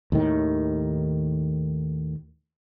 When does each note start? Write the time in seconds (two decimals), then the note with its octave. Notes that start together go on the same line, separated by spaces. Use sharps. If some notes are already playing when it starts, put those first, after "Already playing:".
0.12 D#2 A2 D#3